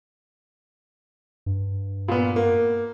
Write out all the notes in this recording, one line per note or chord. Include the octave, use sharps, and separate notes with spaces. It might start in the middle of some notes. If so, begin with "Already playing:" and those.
G2
A#2 B3
A#3